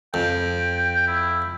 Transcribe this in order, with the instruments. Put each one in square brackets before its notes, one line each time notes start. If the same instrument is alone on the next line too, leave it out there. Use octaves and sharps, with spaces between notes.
[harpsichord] F2 [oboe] G5
[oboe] E4